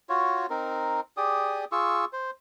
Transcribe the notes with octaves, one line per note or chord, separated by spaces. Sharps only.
F4 F#4 C#5
C4 D#4 A#4
G4 G#4 D5 D#6
F4 G#4 C#6 E6
C5